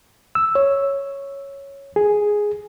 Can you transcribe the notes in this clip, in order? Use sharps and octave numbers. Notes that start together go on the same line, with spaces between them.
E6
C#5
G#4